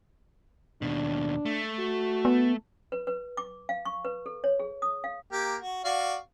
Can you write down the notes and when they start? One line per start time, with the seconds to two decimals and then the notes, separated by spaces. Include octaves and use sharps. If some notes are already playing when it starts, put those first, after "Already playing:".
0.82 D#2 B2 D4
1.46 A3
1.79 F#4
2.25 B3
2.92 B4
3.07 B4
3.37 D6
3.69 F5
3.85 C#6
4.05 B4
4.26 A4
4.44 C#5
4.59 G#4
4.82 D#6
5.04 F5
5.32 A#3 G4
5.62 F#4
5.85 F#4 D5 F5